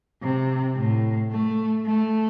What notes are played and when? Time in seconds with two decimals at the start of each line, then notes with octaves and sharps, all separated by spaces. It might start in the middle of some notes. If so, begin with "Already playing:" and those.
0.22 C3
0.77 A2
1.31 A3
1.86 A3